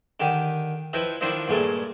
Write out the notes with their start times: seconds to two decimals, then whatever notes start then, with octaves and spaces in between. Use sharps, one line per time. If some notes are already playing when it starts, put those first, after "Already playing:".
0.20 D3 D#3 G4
0.93 F3 E4 B4 D#5 G5
1.21 D#3 F3 D4 E4 C5 D#5
1.48 G2 A#2 G#3 A3